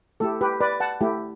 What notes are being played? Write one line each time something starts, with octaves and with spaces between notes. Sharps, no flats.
A3 E4 G4 A4
G4 B4
B4 D5
F#5 A5
A3 E4 G4